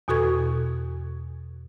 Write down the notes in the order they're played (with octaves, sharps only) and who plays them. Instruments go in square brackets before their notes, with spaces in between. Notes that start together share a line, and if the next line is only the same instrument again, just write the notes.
[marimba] E2 B2 F#4 A4 C#6 G#6